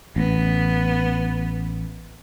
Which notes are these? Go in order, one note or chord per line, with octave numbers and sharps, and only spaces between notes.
A1 B3